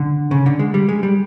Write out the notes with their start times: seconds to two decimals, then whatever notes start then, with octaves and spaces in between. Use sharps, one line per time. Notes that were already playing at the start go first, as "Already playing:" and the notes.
Already playing: D3
0.31 C#3
0.46 D3
0.59 G#3
0.74 G3
0.89 G#3
1.03 G3